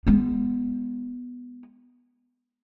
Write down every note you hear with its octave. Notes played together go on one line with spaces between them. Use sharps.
G#3 B3